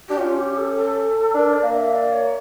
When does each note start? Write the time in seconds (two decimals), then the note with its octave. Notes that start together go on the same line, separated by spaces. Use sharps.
0.08 D4 G4
0.17 C#4 F4
0.37 G4
0.57 A4
0.75 A4
1.34 D4 A#4
1.53 D5
1.63 A#3
1.74 E5
1.93 D5
2.11 C#5